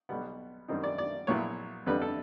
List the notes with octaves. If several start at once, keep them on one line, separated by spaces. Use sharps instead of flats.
B1 B2 G3 B3
F#2 D#3 G3 C4 D#4
D5
D5
A#1 A#2 F#3 B3 E4 C#5
F2 D3 G3 B4
A4